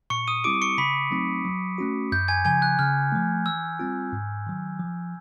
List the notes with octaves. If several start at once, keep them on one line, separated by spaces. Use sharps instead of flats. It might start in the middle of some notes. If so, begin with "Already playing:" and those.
A#2 C#6 C#7
D#6 D#7
G3 C4 E4 G4 D6 D7
C#6 C#7
C#3 B5 B6
F#3 A3 C4 D#4
F#3
A3 C#4 F#4
F#2 G6
G#5 G#6
C#3 F3 G#5 G#6
F#6
C#3 F6
F3 A3
E3 E6
G3 C4 F4
G#2
D#3 F#3
F3